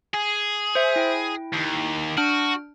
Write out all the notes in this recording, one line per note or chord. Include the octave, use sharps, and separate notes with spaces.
G#4
C5 E5
E4 G5
D#2
D4 F#4 F6 D7